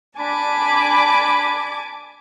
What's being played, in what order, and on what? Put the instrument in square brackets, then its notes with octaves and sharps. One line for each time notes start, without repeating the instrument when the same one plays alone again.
[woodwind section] D4 B5 [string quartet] G#5 A5 D6